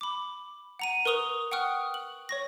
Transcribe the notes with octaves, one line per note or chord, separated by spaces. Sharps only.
B5 D6
F#5 A#5 D#7
A#4 B4 C#6 D#6 F7 G7
F#5 G5 C#6 D#6 F6 F#6
F#7
C#5 C#6 A#6